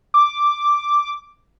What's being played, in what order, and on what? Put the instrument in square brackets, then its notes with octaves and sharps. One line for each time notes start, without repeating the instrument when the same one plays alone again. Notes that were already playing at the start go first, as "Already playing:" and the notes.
[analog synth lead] D6